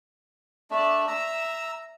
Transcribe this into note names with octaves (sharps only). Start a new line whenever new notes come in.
A3 D4 D5 E5
E5 A#5 E6